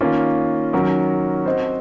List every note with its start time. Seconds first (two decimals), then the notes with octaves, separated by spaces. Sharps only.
0.01 D#3 A#3 C#4 F4
0.73 D#3 F#3 C#4 F#4 A#4
1.46 C4 F#4 C5 D#5